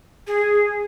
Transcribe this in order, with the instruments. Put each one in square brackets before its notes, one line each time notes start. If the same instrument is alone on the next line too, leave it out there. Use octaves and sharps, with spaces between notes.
[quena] G#4